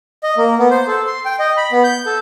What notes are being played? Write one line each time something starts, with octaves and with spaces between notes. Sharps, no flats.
D#5
A#3
B3
C5
A4
C6
G5
D#5
B5
B3
G6
A4